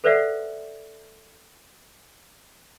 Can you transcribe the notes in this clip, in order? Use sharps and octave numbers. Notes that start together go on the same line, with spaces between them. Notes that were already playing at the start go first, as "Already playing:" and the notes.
A4 B4 C5 D5 E5 F#5